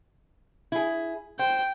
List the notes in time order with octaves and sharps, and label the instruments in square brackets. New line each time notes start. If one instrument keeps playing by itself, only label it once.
[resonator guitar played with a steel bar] E4 G#4
[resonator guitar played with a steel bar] C5 [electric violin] G5